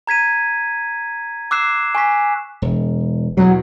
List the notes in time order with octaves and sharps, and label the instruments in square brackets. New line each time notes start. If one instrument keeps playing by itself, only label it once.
[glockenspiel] A#5 G#6 B6 D#7
D6 E6 F#6 C7 E7
G#5 C#6 B6
[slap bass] E1
[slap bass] E2 B2 [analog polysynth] F#3